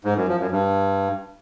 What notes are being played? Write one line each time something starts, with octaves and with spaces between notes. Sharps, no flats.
G#2
F#2
F3
F#2
G2